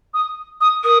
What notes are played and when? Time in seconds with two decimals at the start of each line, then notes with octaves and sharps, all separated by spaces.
0.14 D#6
0.61 D#6
0.84 A#4 D#6